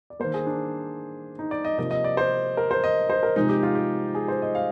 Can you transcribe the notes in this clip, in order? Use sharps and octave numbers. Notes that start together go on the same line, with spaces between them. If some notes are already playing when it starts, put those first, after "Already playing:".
D5
D#3 A#3 C5
G#4
D4
D#4
D5
D#5
C3 F3 A#3 D#5
D#5
D5
C5
A#4
C5
D#5
C5
A#4
C3 F3 G#3 D#4
G4
F4
G4
G#4
C5
D#5
F5